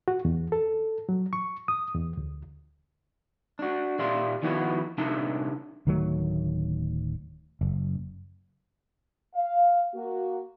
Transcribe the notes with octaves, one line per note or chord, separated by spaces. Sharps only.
F#4
E2
A4
F#3
C#6
D#6
E2
D2
D4 F#4
A#2 G4 D5 E5 F5 C6
D#3 F3 B3 E4 F#4
C2 C3 D4 D#4 E5 A5
D1 D#3 F#3 A3
F#1
F5
A#3 F#4